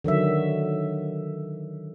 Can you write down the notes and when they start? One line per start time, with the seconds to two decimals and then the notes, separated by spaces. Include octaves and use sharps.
0.04 D3 D#3 F#3 E5